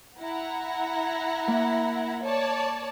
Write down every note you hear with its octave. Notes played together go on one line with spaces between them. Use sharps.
E4 F#5 A#5
A#3 E5
C#5 D5 A5